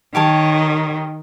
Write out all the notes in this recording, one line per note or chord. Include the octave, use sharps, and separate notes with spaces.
D#3 G4 C#5 A5